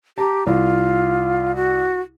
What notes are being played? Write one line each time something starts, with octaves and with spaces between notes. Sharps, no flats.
G4 A5 A#5
C2 F4
F#4